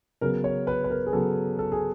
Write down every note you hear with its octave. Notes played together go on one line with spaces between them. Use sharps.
C#3 F#3 B3 A#4
C#5
B4
B4
A#4
G#4
C#3 F#3 B3 A4
A4
G#4